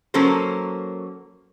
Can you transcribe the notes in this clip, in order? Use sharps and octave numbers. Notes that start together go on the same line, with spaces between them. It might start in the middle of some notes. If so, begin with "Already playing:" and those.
F#3 A#3 C#4 A4 A#4 C5